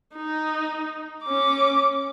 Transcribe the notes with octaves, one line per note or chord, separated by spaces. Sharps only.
D#4
C#4 D6